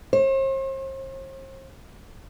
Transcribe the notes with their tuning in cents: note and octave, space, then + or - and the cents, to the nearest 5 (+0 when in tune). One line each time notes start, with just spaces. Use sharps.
C5 +40